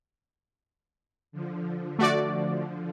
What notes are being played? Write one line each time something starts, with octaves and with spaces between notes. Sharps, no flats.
D3 F3
A3 F#4 D5